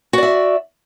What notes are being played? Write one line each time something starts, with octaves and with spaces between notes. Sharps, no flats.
F#4 D5 E5